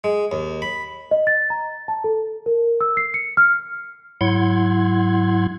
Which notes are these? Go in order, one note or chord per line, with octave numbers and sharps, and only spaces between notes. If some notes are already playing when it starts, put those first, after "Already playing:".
G#3
D#2
B5
D#5
A6
A#5
A5
A4
A#4
E6
C7
C#7
F6
G#2 F#3 E4 F#5 C6 G#6